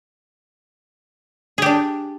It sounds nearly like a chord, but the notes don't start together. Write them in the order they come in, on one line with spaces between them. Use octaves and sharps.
G#4 G4 D4